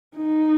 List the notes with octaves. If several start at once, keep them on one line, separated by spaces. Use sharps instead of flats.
D#4